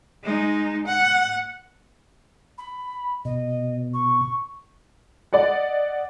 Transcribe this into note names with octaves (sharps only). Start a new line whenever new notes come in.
G#3 D#4
F#5
B5
B2 D#5
C#6
D5 D#5 F#5